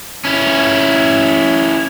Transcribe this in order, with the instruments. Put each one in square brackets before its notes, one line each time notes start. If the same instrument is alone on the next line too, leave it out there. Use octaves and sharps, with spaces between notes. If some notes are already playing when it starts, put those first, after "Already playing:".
[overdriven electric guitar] C#4 E4